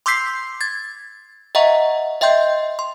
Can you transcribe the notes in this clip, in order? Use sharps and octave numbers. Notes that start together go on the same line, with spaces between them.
C6 D6 E6 G6 B6 C7
G#6 A6
D#5 E5 F#5 A#5 C#6
D#5 E5 G5 C6 G6
C6